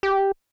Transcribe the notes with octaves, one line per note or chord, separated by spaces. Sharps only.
G4